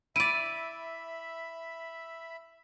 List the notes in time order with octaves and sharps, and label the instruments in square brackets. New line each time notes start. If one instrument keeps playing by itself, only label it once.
[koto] E4 D5 [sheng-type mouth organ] E5 B5 [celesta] D7 D#7